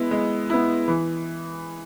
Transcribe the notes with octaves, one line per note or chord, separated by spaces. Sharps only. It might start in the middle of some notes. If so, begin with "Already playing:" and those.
Already playing: G#3 B3 E4
G#3
B3 E4
E3